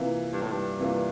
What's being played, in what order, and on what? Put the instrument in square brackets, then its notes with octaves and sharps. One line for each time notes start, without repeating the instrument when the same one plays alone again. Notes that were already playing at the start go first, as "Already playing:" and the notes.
Already playing: [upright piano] C3 E3 A#3 F4
[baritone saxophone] G2
A2
G2
[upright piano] C3 E3 A#3 F4